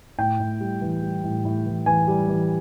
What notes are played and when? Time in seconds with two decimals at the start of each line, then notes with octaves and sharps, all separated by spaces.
0.18 A2 G5
0.40 A2
0.61 G3
0.81 E3
1.02 G3
1.24 A2
1.45 A2
1.66 E3
1.86 E3 G#5
2.08 G3
2.29 E3